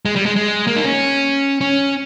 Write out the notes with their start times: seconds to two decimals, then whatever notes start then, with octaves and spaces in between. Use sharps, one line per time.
0.06 G#3
0.16 G3
0.26 G#3
0.36 G#3
0.67 A#3
0.76 D#4
0.84 C#4
1.61 C#4